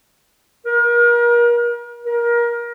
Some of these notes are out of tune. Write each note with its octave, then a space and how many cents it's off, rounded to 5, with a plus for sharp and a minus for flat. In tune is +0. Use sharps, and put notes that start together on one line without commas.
A#4 +35
A#4 +25